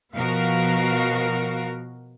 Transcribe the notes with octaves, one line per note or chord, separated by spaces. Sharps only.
B2 F3 B3 F#4 A#4 F5